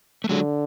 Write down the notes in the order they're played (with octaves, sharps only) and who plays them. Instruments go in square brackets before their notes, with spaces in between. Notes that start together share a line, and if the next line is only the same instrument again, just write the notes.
[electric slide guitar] A3
[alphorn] D3 [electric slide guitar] F#3 G#3